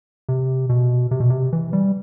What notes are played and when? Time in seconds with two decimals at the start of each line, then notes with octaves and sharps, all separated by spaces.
0.29 C3
0.69 B2
1.11 C3
1.20 B2
1.30 C3
1.53 E3
1.73 G3